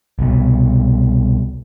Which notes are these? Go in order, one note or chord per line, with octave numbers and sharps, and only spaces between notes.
C2 B2